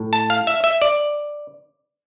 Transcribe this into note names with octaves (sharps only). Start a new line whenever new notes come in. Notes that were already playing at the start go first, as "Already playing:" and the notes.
Already playing: A2
A5
F5
E5
E5
D5